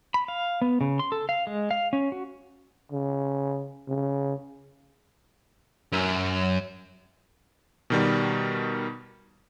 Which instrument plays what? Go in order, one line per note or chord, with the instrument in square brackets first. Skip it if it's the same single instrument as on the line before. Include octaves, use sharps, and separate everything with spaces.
[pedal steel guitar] B5
F5
B3
C#3
C6
A4
F5
G#3
F5
C#4
F#4
[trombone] C#3
C#3
[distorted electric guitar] F#2
[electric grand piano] B2 D#3 G3